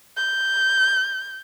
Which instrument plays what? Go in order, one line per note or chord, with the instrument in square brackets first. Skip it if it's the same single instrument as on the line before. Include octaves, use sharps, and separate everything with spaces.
[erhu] G6